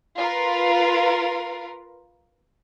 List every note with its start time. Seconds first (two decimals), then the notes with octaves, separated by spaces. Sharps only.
0.18 F4 A#4 B4